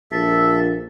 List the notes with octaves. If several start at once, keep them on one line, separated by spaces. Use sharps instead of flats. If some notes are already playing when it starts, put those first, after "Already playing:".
A#1 A4 E5